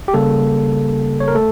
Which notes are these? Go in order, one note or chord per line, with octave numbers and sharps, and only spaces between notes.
G4
C#3 G3 A#3 A4
C#5
A#4
A3 A4